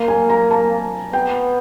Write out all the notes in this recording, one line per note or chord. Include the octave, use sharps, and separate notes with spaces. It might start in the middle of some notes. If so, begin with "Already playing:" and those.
Already playing: A#3
G#5
A#5
A5
B3 G5